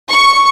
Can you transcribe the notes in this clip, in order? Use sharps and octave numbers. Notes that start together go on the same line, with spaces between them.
C#6